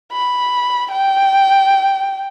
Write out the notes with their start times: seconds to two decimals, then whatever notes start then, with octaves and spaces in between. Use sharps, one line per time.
0.12 B5
0.91 G5